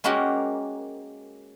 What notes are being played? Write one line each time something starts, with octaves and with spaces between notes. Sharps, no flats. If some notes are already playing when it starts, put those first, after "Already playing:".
G#3 A#3 C#4 F#4 G4 A#4